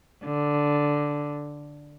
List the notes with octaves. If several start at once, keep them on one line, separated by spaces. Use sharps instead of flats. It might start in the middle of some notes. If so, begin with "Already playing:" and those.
D3